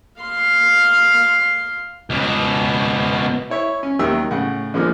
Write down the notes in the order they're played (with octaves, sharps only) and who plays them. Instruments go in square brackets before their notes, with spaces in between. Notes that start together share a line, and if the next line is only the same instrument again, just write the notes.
[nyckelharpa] F5 C6
[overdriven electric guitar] C#2 B2
[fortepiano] E4 C#5 E5
C#4
D#2 D#3 F#3 G3 E5 E6
A2 C#3 F#5
D3 F3 G#3 A#3 D#4